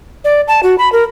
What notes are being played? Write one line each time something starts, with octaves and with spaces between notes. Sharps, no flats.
D5
A5
F#4
B5
A#4